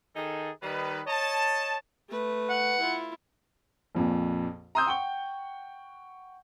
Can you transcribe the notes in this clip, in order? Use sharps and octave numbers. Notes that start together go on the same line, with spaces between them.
D#3 D#4 G#4 A4
D#3 G3 D#4 B4
C#5 D#5 A5
A3 B4
F#5
E4 F4
A#1 F2 A#2
A#5 C6 D#6 E6 G6
F#5 G5 C#6 G7